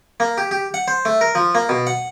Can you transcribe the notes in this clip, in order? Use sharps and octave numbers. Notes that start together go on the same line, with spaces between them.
A#3
G4
G4
F#5
C5
A3
A#4
F3
A#3
B2
F#5